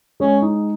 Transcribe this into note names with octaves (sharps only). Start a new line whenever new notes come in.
G#3 C#4
D#4